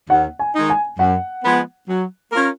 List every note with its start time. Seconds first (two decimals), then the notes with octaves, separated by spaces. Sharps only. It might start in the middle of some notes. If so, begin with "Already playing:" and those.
0.10 D#2 F#5
0.39 G#5
0.55 D#3 G#3 D#4
0.70 G#5
0.99 F#2 F#5
1.44 F3 G#3 B3
1.89 F#3
2.33 C#4 F4 A#4